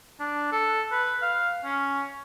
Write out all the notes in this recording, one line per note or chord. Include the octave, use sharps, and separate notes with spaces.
D4
A4
B4
F5
C#4